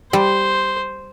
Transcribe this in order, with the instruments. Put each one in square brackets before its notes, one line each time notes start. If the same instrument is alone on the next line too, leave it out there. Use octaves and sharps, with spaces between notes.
[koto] G3 [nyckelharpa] C5